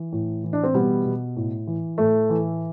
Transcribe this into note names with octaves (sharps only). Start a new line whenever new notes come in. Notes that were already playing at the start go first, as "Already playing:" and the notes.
Already playing: E3
A2
E3
D4
C4
B2 G3 B3
B2
A2
E3
A2 A3
E3